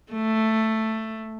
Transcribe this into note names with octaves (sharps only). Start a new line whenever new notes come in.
A3